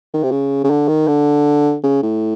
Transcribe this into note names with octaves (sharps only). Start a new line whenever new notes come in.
D#3
C3
C#3
C#3
D3
D#3
D3
C#3
A2